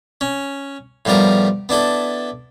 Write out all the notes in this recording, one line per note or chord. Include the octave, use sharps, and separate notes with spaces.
C#4
A2 F3 G3 B3 A#4
B3 D4 E4 A4